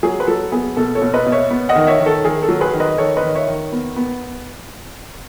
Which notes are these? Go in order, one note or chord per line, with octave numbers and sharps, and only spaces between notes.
F#3 G#4
B4
F#3 A4
B3 G#4
B2 A4
A4 C#5
B2
B4 D#5
B2
C#5 E5
B3
D#5 F#5
D#3
C#5 E5
D#3
A4
D#3 G#4
A4
F#3
G#4 B4
D#3
B4 D#5
D#3 A4 C#5
B4 D#5
D#3
C#5 E5
D#3
B3
B3